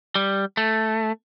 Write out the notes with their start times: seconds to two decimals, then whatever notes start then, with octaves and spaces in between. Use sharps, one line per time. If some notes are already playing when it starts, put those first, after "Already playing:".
0.15 G3
0.57 A3